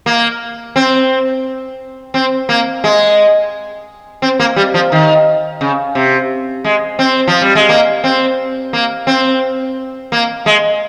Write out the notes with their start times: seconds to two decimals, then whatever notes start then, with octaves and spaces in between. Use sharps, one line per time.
0.06 A#3
0.76 C4
2.14 C4
2.49 A#3
2.84 G#3
4.22 C4
4.39 A#3
4.56 G3
4.74 F3
4.92 D#3
5.61 C#3
5.95 C3
6.65 G#3
6.99 C4
7.28 F3
7.42 G3
7.55 G#3
7.69 A#3
8.04 C4
8.73 A#3
9.07 C4
10.12 A#3
10.46 G#3